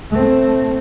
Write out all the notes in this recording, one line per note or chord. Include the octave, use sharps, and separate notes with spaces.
A3 C4